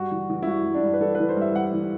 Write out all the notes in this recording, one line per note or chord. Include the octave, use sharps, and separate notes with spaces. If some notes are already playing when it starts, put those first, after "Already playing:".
Already playing: G2 F#4
E3
E3
E4
G2 F#4
G2
D4
G2
B4
E3 A4
B4
E3
C5
G2 E5
G2 F#5
E3